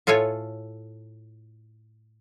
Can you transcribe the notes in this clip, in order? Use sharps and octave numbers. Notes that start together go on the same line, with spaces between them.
A2 F4 A4 C#5 G#5